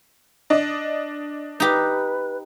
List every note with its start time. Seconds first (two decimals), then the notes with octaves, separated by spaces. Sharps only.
0.50 D4 D#5
1.60 D#4 G4 B4